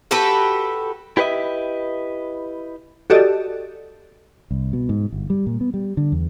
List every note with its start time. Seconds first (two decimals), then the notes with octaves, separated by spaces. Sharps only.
0.11 F#4 G4 A4 B4
1.17 E4 G4 B4 C#5 D#5 E5
3.10 F#4 G4 A4 D5 D#5
4.51 C2
4.73 B2
4.89 G#2
5.12 G1
5.30 G3
5.47 A#2
5.61 B3
5.74 G3
5.97 D3
6.12 E2